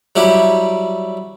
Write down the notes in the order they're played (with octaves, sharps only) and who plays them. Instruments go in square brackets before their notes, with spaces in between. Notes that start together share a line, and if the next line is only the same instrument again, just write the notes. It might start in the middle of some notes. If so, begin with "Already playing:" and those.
[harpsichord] F#3 G3 E4 G4 E5